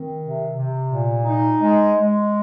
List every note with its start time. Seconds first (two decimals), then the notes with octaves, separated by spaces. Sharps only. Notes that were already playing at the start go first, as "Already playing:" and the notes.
Already playing: D#3 C4
0.19 C3
0.53 C3
0.88 A#2
1.24 D#4
1.60 G#3
1.95 G#3